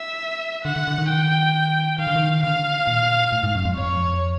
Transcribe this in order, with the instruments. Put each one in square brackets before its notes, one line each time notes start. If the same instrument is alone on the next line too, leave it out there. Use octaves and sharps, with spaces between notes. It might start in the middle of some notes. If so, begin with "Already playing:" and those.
Already playing: [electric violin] E5
[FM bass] D3 [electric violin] F#5
[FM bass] D3
D3
D#3
[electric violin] G5
[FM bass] D#3 [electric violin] F5
[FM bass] D3
D#3
[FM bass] D3 [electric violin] F5
[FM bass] A#2
A2
G#2
F#2
F2
[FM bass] F2 [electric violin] C#5